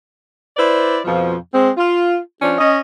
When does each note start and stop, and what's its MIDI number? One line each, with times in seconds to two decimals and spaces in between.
0.57 0.98 64
0.57 0.98 71
0.57 0.98 72
0.57 0.98 74
1.05 1.35 41
1.05 1.35 47
1.05 1.35 53
1.54 1.70 56
1.54 1.70 60
1.78 2.17 65
2.41 2.55 53
2.41 2.55 61
2.41 2.55 62
2.59 2.78 61
2.59 2.78 75